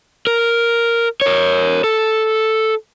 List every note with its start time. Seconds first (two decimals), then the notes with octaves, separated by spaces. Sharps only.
0.27 A#4
1.21 A#4 C#5
1.84 A4